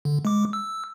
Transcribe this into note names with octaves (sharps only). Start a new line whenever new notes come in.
D3
G#3 D6
E6